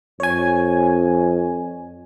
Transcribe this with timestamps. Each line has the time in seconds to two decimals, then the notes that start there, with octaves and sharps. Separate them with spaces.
0.20 F2 C#5 G#5